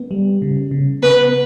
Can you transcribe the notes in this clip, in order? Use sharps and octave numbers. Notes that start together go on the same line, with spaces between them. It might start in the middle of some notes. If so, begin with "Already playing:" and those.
Already playing: B3
G3
C#3
C#3
B3 B4